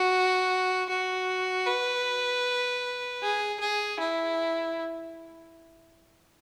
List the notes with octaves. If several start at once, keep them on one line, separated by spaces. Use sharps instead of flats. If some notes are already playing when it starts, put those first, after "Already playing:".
Already playing: F#4
F#4
B4
G#4
G#4
E4